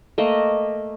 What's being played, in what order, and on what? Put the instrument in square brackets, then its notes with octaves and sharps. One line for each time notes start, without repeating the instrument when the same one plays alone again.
[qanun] A3 A#3 D#5